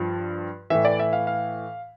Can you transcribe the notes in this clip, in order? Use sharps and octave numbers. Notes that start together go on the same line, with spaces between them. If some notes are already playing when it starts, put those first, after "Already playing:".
Already playing: G2 F3
A2 E3 E5
D5
E5
F5
F5